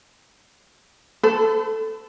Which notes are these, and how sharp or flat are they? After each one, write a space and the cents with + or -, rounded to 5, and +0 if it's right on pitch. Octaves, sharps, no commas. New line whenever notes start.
A4 +0 C5 -45 B5 +35